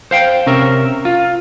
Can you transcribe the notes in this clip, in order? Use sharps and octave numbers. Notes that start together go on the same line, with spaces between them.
C5 F5 G5
C3 C#4 A#4 E5
F4